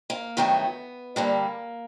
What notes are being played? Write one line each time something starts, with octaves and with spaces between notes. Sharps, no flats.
A#3
G2 D#3 F#3 A3 B3
G2 D3 G3 A#3